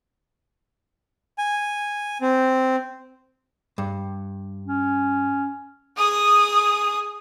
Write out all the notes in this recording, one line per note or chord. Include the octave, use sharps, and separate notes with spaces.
G#5
C4
G2
C#4
G#4 D#6